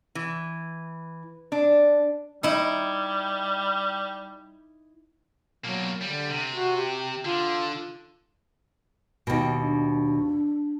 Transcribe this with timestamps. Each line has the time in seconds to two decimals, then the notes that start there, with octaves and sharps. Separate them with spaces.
0.15 E3
1.52 D4
2.43 G3 D#4 E4
5.65 B2 F#3 A#3
6.02 D3 G3
6.31 C3
6.54 F#4
6.77 G4
7.25 D3 F4
9.27 D#2 B2
9.61 D4